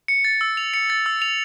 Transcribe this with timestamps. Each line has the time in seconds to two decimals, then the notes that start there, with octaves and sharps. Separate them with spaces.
0.08 C#7
0.25 A6
0.41 E6
0.57 F7
0.74 C#7
0.90 A6
1.06 E6
1.22 F7